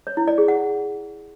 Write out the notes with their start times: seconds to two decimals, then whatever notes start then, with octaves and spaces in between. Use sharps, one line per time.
0.07 C#5
0.17 E4
0.28 D5
0.38 G#4
0.48 F#5